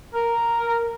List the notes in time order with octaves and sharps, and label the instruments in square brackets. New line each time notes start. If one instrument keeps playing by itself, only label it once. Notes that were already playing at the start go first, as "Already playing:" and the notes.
[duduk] A#4